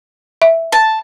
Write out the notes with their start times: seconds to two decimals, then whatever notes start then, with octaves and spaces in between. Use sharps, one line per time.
0.42 E5
0.72 A5